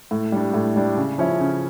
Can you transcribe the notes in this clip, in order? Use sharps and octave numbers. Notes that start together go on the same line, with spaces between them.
A2
G3 D4
A2
G3 D4
C#3
F3 C#4 E4
C#3